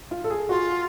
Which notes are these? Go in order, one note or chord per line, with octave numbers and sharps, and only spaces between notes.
F4
A4
G#4
F4 F#4